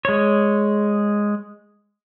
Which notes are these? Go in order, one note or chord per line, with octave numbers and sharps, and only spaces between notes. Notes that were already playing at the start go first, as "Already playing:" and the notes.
G#3 C#5